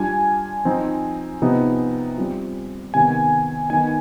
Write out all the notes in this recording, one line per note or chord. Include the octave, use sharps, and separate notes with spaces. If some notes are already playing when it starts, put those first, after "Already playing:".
Already playing: G3 D4 F4 G#5
F3 C4 D#4
C3 F3 B3 D#4
G3 C4 F4
C3 D#3 B3 G#5
D#3 B3 D#4 G#5